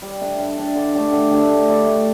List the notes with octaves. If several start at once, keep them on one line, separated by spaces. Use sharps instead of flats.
G3
D4 A4 E5
G3
D4 A4 E5
D3
A3 D4 G4
D3
A3 D4 G4
A3
E4 A4 D5
A3